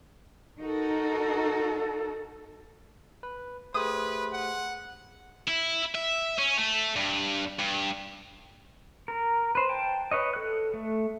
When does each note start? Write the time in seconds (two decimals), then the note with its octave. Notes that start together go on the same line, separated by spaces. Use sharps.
0.60 D#4 F#4 A4 A#4
3.23 B4
3.74 A3 G4 G#4 B4 C5 C6 D#6
4.33 F#5
5.48 E4
5.95 E5
6.39 C#4
6.58 A3
6.96 G2
7.59 G2
9.08 A#4
9.55 B4 C5
9.69 G5 A5
10.11 B4 C#5 D#5
10.34 A4 F#6
10.74 A3